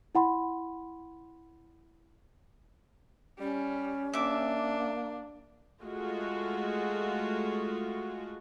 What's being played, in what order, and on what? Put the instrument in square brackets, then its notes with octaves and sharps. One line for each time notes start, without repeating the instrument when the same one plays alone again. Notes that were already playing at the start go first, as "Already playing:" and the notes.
[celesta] E4 F#5 B5 C6
[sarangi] G3 [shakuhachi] C#4
[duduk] A#3 [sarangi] D4 [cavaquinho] E5 D6
[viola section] G#3 A3 F4 F#4